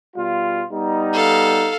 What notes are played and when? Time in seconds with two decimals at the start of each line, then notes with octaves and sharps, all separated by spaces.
0.16 B2 G3 F4
0.71 G3 B3 D#4
1.13 A4 F5